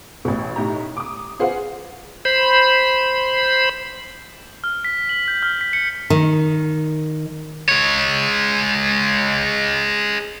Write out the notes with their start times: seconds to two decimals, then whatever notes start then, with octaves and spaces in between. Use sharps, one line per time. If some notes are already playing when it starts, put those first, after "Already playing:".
0.25 A1 B2
0.56 A2 D#4 G4 A#5
0.97 D6 D#6
1.40 F4 G#4 B4 C5 F5 F#5
2.25 C5 B5
4.64 F6
4.85 B6
5.09 F#7
5.28 G6
5.43 F6
5.61 B6
5.73 C#7
6.10 D#3
7.69 G#3 C#5